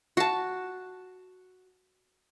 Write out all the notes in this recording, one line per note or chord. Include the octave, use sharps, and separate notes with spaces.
F#4 A5